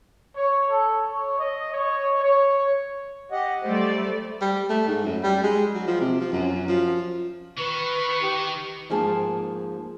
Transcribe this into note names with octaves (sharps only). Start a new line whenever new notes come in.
C#5
A4
C#5
D#5
C#5
C#5
G4 D#5 F#5
G3 A3 G4 C5 D5
G3
A3
G#2
F#2
G3
G#3
F#3
F3
C3
F3
F#2
F3
D#3 B4 C#6
D#4 G4
G#2 F3 A#3 G#4 G#5 A5